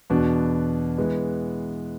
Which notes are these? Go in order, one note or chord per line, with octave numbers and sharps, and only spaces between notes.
E2 B2 B3 D4
E3 G#3 B3